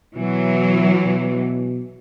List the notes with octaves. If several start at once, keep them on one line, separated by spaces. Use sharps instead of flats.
B2 E3 F#3
B2